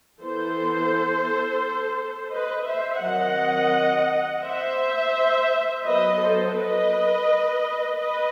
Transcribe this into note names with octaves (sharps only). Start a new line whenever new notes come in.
E3 B3 A4 C5
B4 D#5
C5 E5
D#3 F#3 C4 D#5 F#5
C5 E5
F#3 B3 B4 D#5
A4 C5
B4 D#5
B4 D#5